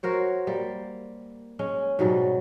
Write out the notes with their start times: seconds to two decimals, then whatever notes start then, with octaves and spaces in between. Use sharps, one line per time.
0.03 F#4 A#4 C5 C#5
0.47 G3 A#3
1.59 G#3 C#4
1.99 G#2 B2 F#3 G3